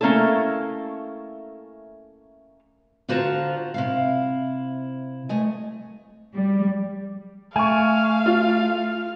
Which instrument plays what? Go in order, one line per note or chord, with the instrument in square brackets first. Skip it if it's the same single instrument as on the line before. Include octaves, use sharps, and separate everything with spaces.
[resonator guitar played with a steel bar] A3 A#3 C#4 E4 A4
[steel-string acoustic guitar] D3 F4 F#4 C5 A5 A#5
C3 E4 F5
A3 D#5 G#5
[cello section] G3
[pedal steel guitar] A3 [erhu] F5 [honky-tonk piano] G#5 C#6
[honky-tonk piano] F4